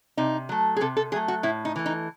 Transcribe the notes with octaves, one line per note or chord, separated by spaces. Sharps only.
C3 D#4
F#3 A3
G#4
C3 A4
A4
F#3 A3 G#4
F#4
A2 E4
D#4
E3 A3
D#4